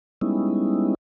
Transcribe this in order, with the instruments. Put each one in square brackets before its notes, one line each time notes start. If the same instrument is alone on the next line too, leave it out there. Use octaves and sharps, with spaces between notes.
[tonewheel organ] G3 G#3 B3 C#4 D#4 E4